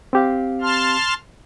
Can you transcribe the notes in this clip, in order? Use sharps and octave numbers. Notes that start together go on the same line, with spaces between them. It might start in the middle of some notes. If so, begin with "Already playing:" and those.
C4 G4 F5
A5 C6 F6